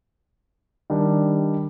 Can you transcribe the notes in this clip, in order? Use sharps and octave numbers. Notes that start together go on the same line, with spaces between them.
D#3 G3 D4